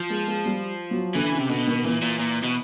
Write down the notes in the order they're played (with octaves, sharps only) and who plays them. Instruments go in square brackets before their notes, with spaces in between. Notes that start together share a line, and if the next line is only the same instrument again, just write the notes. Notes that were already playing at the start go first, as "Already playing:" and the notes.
Already playing: [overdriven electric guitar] F3
[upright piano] G#3
G#3
G3
F#3
[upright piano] D3 [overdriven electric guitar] E3
[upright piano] C#3
[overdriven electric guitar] C3
[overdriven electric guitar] B2 [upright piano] D3
[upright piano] D#3
[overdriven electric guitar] A#2 [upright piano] E3
[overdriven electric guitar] A#2
A#2
B2